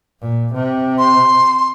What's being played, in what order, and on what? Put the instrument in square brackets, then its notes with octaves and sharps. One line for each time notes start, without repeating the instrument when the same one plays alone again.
[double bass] A#2
C3
[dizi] C6